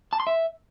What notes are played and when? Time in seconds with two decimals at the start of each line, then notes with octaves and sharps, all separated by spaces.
0.13 A5
0.20 C6
0.27 E5